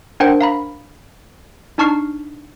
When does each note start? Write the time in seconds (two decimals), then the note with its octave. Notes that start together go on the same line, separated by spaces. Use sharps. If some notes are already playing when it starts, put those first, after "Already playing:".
0.20 D4 A#4 C5 F#5 G5
0.41 F5 A#5 B5
1.78 D4 D#4 A5 C#6 F6 C7